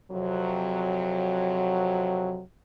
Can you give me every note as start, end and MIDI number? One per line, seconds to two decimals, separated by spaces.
0.12 2.41 41
0.12 2.41 48
0.12 2.41 54